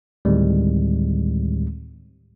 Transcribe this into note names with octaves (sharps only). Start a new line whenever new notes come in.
D2 A2 D#3 G3 G#3 C4